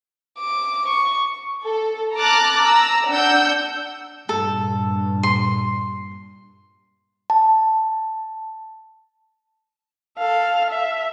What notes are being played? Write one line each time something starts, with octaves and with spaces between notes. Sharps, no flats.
D6
C#6
A4
A5 A#5 D6 F6 F#6 A6
A#5 E6
D4 F#5 E6 G6
G2 A#2 A4
C6
A5
A4 F5
E5